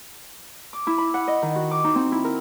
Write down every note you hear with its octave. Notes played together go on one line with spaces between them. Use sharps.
D6
E4
B5
F#5
D#5
D#3
F#4
D6
D#4
C4
E4
A#4